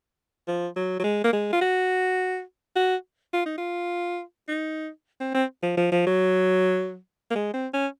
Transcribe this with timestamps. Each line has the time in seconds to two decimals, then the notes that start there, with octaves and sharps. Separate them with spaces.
0.47 F3
0.76 F#3
1.00 F#3
1.04 G#3
1.24 A#3
1.33 G#3
1.53 F4
1.61 F#4
2.76 F#4
3.34 F4
3.46 D#4
3.58 F4
4.48 D#4
5.20 C4
5.35 C4
5.63 F3
5.77 F3
5.92 F3
6.07 F#3
7.31 A#3
7.36 G#3
7.54 C4
7.74 C#4